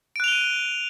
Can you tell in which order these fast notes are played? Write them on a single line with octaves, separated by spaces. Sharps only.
D7 F#6 F7 G7 D#7